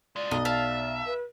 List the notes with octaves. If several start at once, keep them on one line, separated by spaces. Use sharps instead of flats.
G#3 F4 D5
B1 D#5
E5 F5 A5
B4